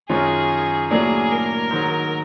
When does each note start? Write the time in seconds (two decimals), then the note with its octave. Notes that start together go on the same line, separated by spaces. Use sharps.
0.09 F#2 D#3 G#3 C#4 F4 G#4
0.91 A2 F#3 A#3 D4 G#4
1.31 A#4
1.71 G#2 D#3 F#3